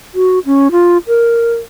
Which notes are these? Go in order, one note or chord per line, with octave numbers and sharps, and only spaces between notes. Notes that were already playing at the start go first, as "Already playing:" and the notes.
F#4
C#4
F4
A#4